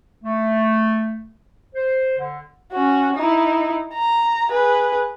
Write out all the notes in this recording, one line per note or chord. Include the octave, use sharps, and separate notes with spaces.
A3
C5
D3
C#4 F#4
D#4 E4
A#5
G#4 B4